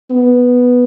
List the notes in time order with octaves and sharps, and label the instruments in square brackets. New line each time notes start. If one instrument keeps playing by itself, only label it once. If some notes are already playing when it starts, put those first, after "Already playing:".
[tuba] B3